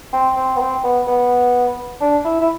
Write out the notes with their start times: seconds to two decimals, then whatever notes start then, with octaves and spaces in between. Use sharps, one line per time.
0.13 C4
0.36 C4
0.56 B3
0.60 C4
0.84 B3
1.07 B3
2.01 D4
2.24 E4
2.40 E4